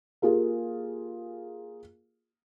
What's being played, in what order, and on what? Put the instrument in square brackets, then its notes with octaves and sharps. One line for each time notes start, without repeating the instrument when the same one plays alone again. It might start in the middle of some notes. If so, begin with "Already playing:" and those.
[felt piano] A#3 F4 G4 G#4